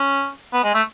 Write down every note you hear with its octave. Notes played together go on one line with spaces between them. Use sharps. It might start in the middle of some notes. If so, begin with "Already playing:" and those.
Already playing: C#4
B3
G#3
A3